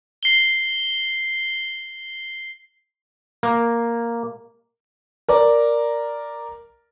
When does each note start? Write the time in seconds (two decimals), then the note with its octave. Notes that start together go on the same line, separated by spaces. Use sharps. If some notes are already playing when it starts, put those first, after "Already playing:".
0.23 C7 G7
3.43 A#3
5.29 A#4 D5